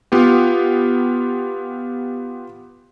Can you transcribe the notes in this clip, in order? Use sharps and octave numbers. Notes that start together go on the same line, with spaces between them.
B3 F4 G4